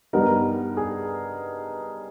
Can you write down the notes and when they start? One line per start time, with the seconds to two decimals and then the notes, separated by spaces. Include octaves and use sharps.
0.13 G2 G3 B3 D#4 A#4
0.77 G#4